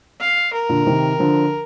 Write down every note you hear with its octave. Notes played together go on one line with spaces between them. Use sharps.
F5
A#4
A#2 D3
C3 D#3
D3 F3